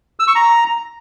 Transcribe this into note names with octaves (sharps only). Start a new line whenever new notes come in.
E6
C#6
A#5